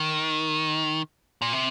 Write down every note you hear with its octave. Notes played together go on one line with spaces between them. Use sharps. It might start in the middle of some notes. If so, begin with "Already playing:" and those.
Already playing: D#3
A#2
C3